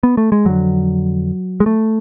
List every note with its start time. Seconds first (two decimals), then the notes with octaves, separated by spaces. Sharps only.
0.03 B3
0.17 A3
0.32 G#3
0.45 F2 D3 F#3
1.60 G#3
1.66 A3